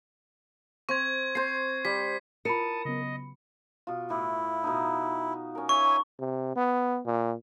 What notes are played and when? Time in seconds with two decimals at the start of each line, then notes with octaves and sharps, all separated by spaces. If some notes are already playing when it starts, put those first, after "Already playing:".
0.89 C4 C#6 G#6
1.35 C4 C5 C7
1.85 G3 B6
2.45 E4 F4 A#4 A5 B5 D#6 C#7
2.85 C#3 F#3 B3 D#5
3.87 B2 F4
4.10 A2 E4
4.64 B2 B3 D#4
5.55 C#4 A#4
5.69 C#5 E5 G#5 C#6
6.19 C3
6.56 B3
7.05 A#2